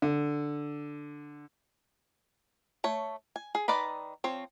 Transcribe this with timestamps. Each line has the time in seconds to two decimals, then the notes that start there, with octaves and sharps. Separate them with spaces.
0.02 D3
2.84 A3 C#5
3.36 G#5
3.55 G#4
3.68 D#3 B4 D5 D#5 B5
4.24 F3 C4 C#5